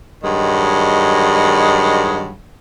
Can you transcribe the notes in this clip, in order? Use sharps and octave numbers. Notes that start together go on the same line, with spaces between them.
G2 D#3 F#3 G#3